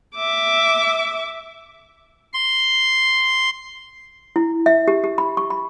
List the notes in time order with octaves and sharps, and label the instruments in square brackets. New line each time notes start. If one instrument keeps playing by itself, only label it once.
[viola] E5 D6
[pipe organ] C6
[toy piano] E4
E5
G4
G4
B5
C#6
B5